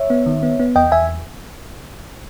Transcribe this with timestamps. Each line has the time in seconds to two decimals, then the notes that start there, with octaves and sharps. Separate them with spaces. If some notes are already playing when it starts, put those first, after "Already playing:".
Already playing: C#5 E5
0.10 B3
0.26 D#3
0.43 B3
0.60 B3
0.76 E2 D#5 G5
0.92 E2 E5 G#5